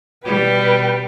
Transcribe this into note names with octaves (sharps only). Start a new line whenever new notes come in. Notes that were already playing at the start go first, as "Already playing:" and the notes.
B2 G3 B4 G5